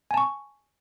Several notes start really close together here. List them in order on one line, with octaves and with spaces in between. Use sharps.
G#5 A5 C#6